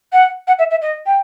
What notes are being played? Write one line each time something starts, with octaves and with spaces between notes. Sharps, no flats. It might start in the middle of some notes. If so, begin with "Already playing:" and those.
F#5
F#5
E5
E5
D#5
G5